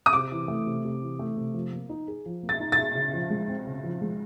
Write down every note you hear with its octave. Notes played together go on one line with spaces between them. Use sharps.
D#6
C3 D6
E3
A3
C3
C3
E3
A3
C3
F3
A#3
D#4
G#4
F3
A#3
A6
D#4
A6
G#4
C#3
F3
G#3
C4
C#3
F3
G#3